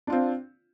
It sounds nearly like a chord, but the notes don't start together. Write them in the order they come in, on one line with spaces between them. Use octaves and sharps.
D4 F4 C4